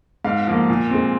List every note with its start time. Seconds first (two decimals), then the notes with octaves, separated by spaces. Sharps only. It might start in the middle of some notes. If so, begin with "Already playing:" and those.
0.24 G#2 F5
0.47 F3 A#3
0.69 A#2
0.90 G#3 C4